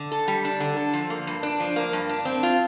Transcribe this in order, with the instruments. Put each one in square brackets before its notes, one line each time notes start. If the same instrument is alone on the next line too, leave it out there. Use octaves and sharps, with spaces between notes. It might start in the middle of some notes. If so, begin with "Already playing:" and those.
Already playing: [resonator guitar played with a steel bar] D3
A4
G3
D4
D3
A4
F3
A#3
G2
D4
F3
A#3
G2
D4
C4
F4